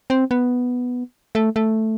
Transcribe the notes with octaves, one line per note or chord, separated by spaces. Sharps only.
C4
B3
A3
A3